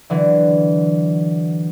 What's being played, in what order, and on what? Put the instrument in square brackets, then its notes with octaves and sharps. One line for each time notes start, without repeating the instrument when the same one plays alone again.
[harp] D3 E3 F#3